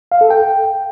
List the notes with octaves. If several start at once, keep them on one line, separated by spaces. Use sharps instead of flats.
F5
A4
G5